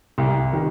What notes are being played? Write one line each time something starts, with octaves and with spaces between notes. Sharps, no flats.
C2
C3 D#3